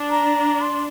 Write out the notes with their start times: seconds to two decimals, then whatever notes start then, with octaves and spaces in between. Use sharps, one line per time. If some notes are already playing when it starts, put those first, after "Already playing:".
Already playing: D4
0.10 A#5
0.61 C6